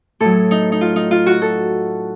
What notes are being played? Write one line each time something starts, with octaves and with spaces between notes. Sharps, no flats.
A2 F#3 A4
D#4
D#4
F4
D#4
F4
F#4
A4